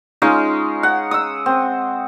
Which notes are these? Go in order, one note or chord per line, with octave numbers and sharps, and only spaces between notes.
G#3 C#4 D#4 F4
F#5
D#6 E6
C4